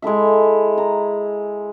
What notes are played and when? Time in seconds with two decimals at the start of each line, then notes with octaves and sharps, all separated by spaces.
0.02 G#3 E4 A4 E5
0.78 A#5